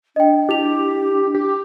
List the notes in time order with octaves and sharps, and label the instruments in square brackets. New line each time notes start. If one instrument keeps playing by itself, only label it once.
[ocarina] D4 [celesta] D#5 G5
[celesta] E4 F7 [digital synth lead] G4
[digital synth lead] G4